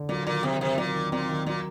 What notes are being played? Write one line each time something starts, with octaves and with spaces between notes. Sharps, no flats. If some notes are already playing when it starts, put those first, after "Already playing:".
Already playing: D3
A#2 F#3
A#2 D#3
C3 C4
C3 D#3
A#2 F#3
D#3
A#2 C4
D#3
A#2 F#3